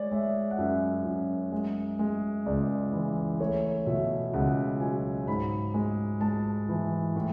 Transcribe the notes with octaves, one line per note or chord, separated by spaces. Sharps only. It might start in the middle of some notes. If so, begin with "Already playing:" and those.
Already playing: G#3 C#5 D5
G#3 E5
F#5
F#2 E5
F#2
G#3
G#3
C#2 D5
E3
A3 C#5
B2 E5
C#2 F#5
F#3 G#5
G#2 B5
G#3
G#3 A5
E3
A2